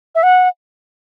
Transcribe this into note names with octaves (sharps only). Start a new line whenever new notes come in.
E5
F#5